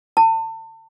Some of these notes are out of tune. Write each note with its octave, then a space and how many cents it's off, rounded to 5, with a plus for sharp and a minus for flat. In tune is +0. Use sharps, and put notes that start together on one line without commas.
A5 +35